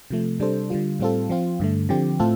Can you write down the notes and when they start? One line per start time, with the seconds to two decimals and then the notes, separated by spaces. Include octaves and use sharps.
0.11 C3 F3 A3
0.40 C3 G3 D4 A4 C5
0.70 D3 G3 F4
1.00 A2 G3 C4 F4 A4
1.29 F3 C4 F4
1.60 G2 D3 A3
1.89 D3 F3 C4 G4
2.20 A2 A3 C4 F4 A4